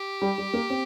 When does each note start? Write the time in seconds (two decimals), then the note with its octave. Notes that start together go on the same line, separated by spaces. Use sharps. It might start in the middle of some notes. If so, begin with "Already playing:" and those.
Already playing: G4
0.22 G3
0.38 G3
0.53 A#3
0.70 C4